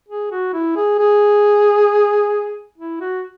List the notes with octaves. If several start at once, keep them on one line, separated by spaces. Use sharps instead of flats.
G#4
F#4
E4
G#4
G#4
E4
F#4